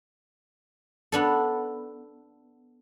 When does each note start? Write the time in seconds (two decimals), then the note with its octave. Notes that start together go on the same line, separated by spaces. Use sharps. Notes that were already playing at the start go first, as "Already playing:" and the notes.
1.12 B3 D4 A4